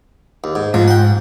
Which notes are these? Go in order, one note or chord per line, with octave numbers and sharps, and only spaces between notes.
D#2
G#2
G#2 F3
F#5 G5